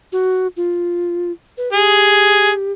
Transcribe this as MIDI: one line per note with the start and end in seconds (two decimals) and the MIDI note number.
0.12 0.47 66
0.57 1.32 65
1.58 1.71 71
1.73 2.72 67
1.73 2.50 68